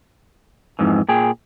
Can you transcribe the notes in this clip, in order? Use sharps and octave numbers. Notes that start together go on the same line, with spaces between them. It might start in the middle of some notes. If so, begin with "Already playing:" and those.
F2 G#2 E3
A#2 G#4 G5